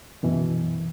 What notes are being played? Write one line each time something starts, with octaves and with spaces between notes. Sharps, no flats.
F#2 B2 E3